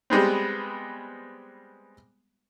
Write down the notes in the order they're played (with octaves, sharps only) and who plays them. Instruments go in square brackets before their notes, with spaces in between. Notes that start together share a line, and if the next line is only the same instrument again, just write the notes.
[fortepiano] G3 G#3 B3 C4